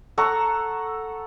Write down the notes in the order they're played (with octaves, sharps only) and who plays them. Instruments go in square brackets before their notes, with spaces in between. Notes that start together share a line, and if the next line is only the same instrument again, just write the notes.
[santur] A4 F#5 A#5 C#6